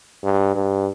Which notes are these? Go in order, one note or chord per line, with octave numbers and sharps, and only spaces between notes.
G2
G2